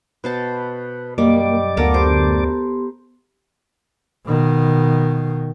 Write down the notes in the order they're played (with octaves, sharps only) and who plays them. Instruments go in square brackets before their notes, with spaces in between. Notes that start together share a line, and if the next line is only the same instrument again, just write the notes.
[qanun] B2 C5 A5 [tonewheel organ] B4
[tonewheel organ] F#2 D5 D6 [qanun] G3 [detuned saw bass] A#3 [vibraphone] D#5 G5
[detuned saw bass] D2 [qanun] B3 A4 A#4 [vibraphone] F5 F#5
[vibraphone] B3 G4 C6 [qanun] C5
[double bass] B2 D#3